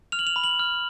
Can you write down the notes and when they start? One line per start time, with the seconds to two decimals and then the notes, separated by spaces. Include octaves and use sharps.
0.12 F6 F7
0.19 F#7
0.27 F7
0.36 B5
0.44 F#7
0.59 F6